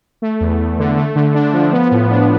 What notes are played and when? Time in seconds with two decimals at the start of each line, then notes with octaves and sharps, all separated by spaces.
0.22 A3
0.41 E2
0.59 E2
0.79 D3
0.97 A3
1.16 D3
1.34 D4
1.53 F3
1.72 B3
1.91 A2
2.10 D4